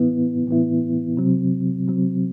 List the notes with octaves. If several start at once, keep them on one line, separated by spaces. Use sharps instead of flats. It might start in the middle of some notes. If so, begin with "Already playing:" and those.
Already playing: A2 E3 B3 E4
A2 E3 B3 E4
C3 F#3 C4
C3 F#3 C4